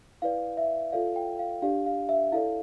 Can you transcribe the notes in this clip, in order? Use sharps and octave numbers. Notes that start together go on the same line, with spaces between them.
E4 B4 D5 F5
E5
F4 A4 D5 F5
G5
F5
D4 G4 D5 F5
F5
E5
E4 A4 D5 F5